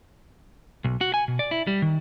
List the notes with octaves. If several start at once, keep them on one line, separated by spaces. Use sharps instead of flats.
B1
F#4
G#5
B2
D5
E4
G3
D#3